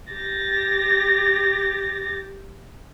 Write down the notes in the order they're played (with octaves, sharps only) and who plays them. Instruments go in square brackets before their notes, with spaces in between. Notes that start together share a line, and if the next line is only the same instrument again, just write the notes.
[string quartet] G4 A6 A#6